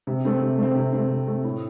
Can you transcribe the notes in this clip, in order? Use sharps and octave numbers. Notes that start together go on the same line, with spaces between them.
C3
A3 C4
C3
A3 C4
C3
A3 C4
C3
A3 C4
A2